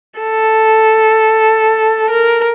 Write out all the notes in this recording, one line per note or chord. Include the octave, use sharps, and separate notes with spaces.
A4
A#4